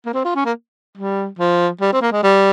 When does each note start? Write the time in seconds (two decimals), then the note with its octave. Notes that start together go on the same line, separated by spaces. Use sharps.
0.06 A#3
0.14 C4
0.25 F4
0.35 C#4
0.45 A#3
0.98 G3
1.39 F3
1.81 G3
1.93 C4
2.02 A#3
2.12 G#3
2.23 G3